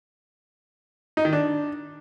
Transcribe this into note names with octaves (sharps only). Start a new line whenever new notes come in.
D#4
D#3
D4